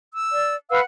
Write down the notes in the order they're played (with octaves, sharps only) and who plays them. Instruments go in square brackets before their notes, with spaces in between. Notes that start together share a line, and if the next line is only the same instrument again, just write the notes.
[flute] E6
[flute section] D5
[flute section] B4 F5 E6 [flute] F#5